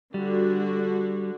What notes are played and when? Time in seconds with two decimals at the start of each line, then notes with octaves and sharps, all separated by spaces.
0.14 D3 G3 F#4